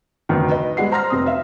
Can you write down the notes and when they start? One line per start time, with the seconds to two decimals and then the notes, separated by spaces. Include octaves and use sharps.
0.29 F1 D2 D#3
0.51 B4 D#5
0.77 G3 G#3 F#5 C7
0.91 C5 A#5 C6 F6 A#6
1.10 F1 C4 D#6
1.26 E5 F5